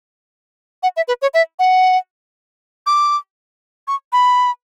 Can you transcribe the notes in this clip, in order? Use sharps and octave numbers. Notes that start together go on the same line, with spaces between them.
F#5
E5
B4
C#5
E5
F#5
D6
C#6
B5